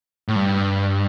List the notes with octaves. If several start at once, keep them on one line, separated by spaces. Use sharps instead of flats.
A2
G2